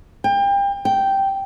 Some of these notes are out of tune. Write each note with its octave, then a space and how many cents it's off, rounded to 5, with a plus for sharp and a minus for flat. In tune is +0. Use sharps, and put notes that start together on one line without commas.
G5 +30
G5 -5